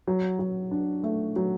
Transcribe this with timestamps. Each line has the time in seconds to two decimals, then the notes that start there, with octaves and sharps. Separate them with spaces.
0.07 F#3
0.39 F#3
0.71 D4
1.03 A3
1.36 F#3